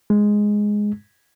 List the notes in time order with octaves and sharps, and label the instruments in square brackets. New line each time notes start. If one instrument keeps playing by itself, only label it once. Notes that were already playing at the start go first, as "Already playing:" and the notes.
[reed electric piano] G#3